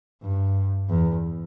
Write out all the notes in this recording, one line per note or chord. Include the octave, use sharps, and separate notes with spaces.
G2
E2